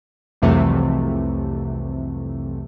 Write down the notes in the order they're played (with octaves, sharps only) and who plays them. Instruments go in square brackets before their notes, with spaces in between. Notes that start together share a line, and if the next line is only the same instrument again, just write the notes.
[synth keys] C2 F2 C3 E3 F#3 A3